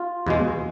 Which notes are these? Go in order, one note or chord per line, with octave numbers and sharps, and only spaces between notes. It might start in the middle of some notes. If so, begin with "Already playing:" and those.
Already playing: F4
E2 B2 G#3